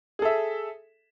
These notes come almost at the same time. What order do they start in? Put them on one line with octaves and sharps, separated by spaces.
G#4 A4 E5